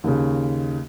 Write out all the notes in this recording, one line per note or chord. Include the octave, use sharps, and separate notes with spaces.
D#2 C#3